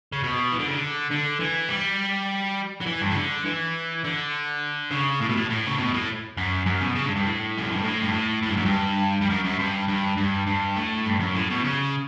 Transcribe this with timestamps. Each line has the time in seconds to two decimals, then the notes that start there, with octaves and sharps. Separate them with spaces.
0.12 C#3
0.24 B2
0.52 E3
0.60 D3
0.67 C#3
0.74 D3
1.11 D3
1.40 E3
1.69 G3
2.81 F#3
2.87 E3
3.01 G2
3.11 C#3
3.16 D3
3.45 E3
4.04 D3
4.91 C#3
5.21 A2
5.29 B2
5.36 A2
5.50 A2
5.67 C#3
5.79 B2
5.94 A2
6.37 F#2
6.66 F#2
6.81 B2
6.95 C#3
7.06 G2
7.16 G2
7.25 A2
7.57 F#2
7.71 G2
7.83 A2
8.02 G2
8.13 A2
8.43 A2
8.49 G2
8.57 F#2
8.65 G2
9.22 G2
9.30 F#2
9.45 F#2
9.59 G2
9.88 G2
10.17 G2
10.47 G2
10.77 A2
11.06 G2
11.20 F#2
11.35 A2
11.50 B2
11.64 C#3